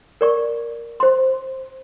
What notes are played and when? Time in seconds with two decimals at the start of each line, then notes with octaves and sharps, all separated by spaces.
0.21 A#4 D5 C#6
1.00 C5 C6